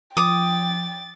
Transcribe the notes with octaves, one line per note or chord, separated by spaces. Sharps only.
F3 G5 D6 D#6 A6